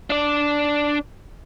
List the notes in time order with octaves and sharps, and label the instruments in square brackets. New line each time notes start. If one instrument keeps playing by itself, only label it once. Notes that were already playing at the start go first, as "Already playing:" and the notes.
[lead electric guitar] D4 D5